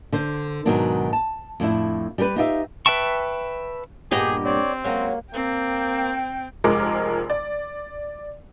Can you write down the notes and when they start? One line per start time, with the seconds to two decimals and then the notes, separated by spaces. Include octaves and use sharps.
0.12 D3 C5
0.66 G#2 B2 D#3 F#3 D4
1.13 A5
1.60 F2 A2 D4 E4
2.18 G3 G4 A#4 B4
2.36 D#4 F4 G4 E5
2.86 B4 E5 G5 A5 C#6
4.11 G2 A#2 B3 G4 G#4 D#5 A#5
4.45 C4 C#5 D5
4.84 F#3 G#3 A#3 C#4
5.34 A#3 C4 G5
6.64 F1 F3 G#3 A#4 D6
7.30 D5